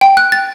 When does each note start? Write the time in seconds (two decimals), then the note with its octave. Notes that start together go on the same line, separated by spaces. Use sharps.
0.01 G5
0.17 F#6
0.32 A6